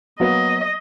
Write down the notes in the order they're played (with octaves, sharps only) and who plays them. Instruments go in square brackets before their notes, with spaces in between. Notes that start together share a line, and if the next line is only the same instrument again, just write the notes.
[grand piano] F#3 A#3 B3 [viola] D#5